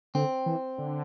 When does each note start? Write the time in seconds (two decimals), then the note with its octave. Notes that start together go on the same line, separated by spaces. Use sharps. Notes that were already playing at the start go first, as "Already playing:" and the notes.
0.15 D3 C4
0.46 E3
0.78 D3